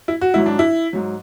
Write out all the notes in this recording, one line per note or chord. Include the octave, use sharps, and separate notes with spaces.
E4
F#4
G#2 F#3 E4
D4
E4
G#2 F#3